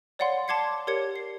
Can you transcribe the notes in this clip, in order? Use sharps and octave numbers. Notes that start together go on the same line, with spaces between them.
C#5 D5 F5 F#5 B5 C6
A5 C6 D6 G#6 C7 C#7
G4 A#4 C#5 D5 G#6 C#7
C7